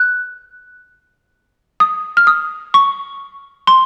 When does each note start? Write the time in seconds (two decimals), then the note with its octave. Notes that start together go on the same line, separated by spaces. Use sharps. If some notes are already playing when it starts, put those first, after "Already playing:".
Already playing: F#6
1.80 D#6
2.17 F6
2.27 D#6
2.74 C#6
3.67 C6